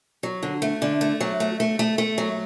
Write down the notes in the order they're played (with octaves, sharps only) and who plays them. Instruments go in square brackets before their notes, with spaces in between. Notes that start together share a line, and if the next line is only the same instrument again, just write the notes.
[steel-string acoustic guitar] F#3
D3
A3
D3
A3
F#3
A3
A3
A3
A3
F#3